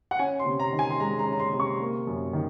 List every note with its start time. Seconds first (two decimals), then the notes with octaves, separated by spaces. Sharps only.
0.11 F#5
0.19 C#4 G#5
0.39 C6
0.46 C3
0.59 A#5
0.73 D#3
0.79 G#5
0.90 C6
1.00 G#3 A#5
1.19 A#5
1.26 C#4
1.33 A#5
1.40 C6
1.53 C3
1.60 C#6
1.80 A#3
2.07 F#2
2.33 D#3